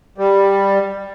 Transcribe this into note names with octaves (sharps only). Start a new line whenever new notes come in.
G3